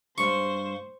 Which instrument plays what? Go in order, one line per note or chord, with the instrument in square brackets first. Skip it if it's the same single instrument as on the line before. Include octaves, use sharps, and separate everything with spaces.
[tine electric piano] G2 G3 F5 [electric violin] C5 [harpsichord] C#6